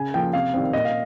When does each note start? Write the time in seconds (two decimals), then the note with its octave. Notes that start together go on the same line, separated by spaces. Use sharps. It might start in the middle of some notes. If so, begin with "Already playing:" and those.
Already playing: C#3 G#5
0.14 F3 A#3 G5
0.33 C3 F5
0.54 D#3 G3 C4
0.73 A#2 D#5
0.85 F5